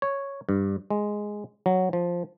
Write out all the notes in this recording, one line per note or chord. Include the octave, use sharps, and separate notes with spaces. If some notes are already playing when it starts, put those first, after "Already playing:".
C#5
G2
G#3
F#3
F3